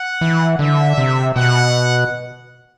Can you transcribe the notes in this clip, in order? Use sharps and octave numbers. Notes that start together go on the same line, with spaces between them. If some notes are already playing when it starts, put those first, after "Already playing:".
Already playing: F#5
E3
D3 E5
C3
B2 F#5